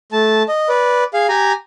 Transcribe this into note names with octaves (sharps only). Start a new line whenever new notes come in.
A3 A5
D#5
B4 D5
G#4 F5
G4 G#5 A#5